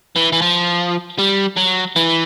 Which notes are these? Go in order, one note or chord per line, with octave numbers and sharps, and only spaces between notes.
E3
E3
F3
G3
F#3
E3